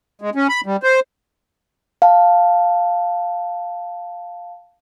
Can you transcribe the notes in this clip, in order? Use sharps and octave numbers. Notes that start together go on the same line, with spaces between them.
G#3
C#4
B5
G3
C5
F5 A5